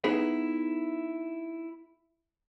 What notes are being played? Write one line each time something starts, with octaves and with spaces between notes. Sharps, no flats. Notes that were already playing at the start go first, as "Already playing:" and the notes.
B3 D#4 E4 G#4 B4 E5